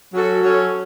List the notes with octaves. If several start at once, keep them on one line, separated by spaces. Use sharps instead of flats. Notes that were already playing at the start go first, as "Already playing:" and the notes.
F#3 C#4 F#4 A4
F#3 C#4 F#4 A4